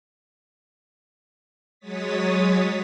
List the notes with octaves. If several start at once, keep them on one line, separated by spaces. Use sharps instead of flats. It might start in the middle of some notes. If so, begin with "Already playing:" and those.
F#3 G#3 C#5 D#6 A6 B6